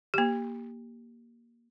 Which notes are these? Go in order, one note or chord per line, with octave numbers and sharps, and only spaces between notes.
A#3 G4